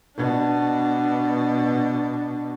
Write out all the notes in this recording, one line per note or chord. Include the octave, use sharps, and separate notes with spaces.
B2 D4